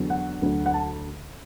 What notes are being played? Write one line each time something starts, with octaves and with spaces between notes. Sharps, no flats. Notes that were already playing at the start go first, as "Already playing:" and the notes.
Already playing: E2 D3 F#3
F#5
D2 D3 F#3
F#5
A5